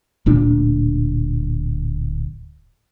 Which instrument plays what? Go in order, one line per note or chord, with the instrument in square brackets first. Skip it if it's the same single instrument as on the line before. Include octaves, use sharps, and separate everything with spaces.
[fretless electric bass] D1 A#2 D4